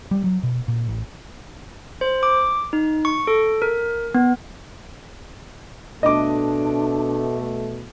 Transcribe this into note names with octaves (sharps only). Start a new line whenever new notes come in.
G3
F#3
B2
A#2
A1
C5
D6
D#4
C#6
A4
A#4
B3
B2 A3 D4 D#5 D6